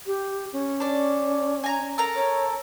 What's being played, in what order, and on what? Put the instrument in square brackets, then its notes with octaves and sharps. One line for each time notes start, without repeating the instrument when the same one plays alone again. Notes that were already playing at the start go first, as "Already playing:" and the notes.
[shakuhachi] G4
C#4
[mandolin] D4 D5
G#5 A#5
A4 A#4 A#5
[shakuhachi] C#5